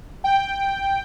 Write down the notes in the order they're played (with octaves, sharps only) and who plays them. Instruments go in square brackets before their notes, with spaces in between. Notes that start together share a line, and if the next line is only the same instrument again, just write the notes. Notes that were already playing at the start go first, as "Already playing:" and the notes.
[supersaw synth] G5